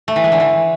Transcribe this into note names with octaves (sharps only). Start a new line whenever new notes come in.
A3
E3
G#3
D3
E3